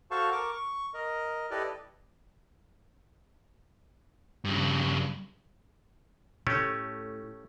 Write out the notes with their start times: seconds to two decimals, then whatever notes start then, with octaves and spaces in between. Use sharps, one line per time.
0.11 F#4 A4 C5 F5 A5 C#6
0.32 A#4 C#6 D6
0.52 C#6
0.94 A#4 D#5
1.51 E4 G4 A4 B4 D5 D#5
4.45 G2 C#3
6.47 A2 A3 C#4 G4